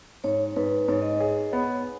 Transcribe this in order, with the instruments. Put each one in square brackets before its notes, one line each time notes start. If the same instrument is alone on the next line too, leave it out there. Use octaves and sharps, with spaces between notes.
[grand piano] G#2 [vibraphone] C#5
[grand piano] G#2 [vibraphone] B4
[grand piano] G#2 [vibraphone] C#5
[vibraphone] D#5
C#5
[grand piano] G#4
B3